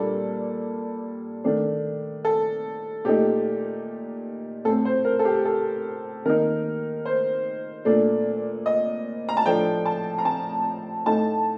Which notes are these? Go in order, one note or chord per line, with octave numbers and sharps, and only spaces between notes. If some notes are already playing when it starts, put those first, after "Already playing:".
Already playing: A#2 G3 A#3 D4 A4
D#3 A3 D4
A4
A#2 A3 D#4 G4
A2 A3 C4 A4
C5
A#4
A4
G4
A4
D#3 A#3 D#4 A#4
C5
A#2 A3 D4
D#5
A#5
A5
A2 F3 A3 D4 G5
A5
A#5
A5
A2 A3 D#4 A5